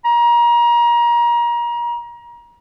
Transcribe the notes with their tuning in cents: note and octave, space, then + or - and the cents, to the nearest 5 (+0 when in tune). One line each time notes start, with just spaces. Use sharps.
A#5 +30